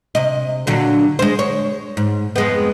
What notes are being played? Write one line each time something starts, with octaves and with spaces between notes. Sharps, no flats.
C3 D#5
A#2 D3 F#3
G#3 C5
C#5
G#2
F2 G#3 B3